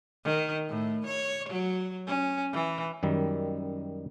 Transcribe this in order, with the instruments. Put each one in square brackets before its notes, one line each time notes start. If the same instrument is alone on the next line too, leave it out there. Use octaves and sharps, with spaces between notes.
[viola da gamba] D#3
A2
C#5
F#3
C#4
E3
[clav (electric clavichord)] F#2 D#3 G3